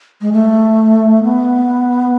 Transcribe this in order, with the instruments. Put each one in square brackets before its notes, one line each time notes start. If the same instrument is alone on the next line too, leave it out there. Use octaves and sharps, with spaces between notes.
[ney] G#3
A3
B3